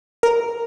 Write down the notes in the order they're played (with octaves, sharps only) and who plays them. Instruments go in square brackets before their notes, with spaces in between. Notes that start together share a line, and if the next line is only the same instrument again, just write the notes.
[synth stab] A#4